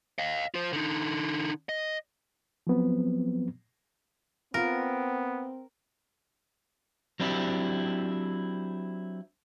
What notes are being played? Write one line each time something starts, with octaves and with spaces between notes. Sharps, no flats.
D#5 F5
F4 C5
D3 D#4
D#5
F3 F#3 B3 C4
B3 C4 F4 A#4
F#3 C4 D4 E4 G4